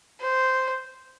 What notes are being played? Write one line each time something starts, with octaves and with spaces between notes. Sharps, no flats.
C5